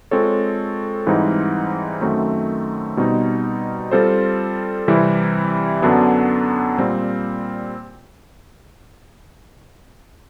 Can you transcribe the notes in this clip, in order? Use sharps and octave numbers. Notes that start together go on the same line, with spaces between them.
G#3 C4 F4 A4 C#5
G#2 E3 G3 C4 D#4
F#2 D#3 F#3 A3 C4
B2 G3 C4 D#4
G3 C4 F4 A4 C5
C3 E3 G3 C4 E4
F#2 D3 F#3 B3 D4
A#2 G3 C4